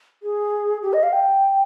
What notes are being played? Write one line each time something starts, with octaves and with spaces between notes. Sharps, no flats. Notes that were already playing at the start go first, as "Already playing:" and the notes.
G#4
G4
D#5
F5
G5